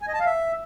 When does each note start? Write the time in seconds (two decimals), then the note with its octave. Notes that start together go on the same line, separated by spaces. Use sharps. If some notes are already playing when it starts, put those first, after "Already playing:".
0.02 G#5
0.08 D#5
0.14 A5
0.20 F5
0.26 E5